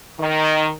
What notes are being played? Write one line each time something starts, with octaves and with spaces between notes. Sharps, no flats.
D#3